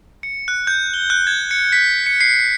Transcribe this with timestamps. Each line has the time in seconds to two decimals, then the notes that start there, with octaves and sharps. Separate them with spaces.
0.23 C#7
0.48 F#6
0.67 G6
0.94 G7
1.10 F#6
1.27 G#6
1.51 C#7
1.72 B6
2.06 C#7
2.21 C7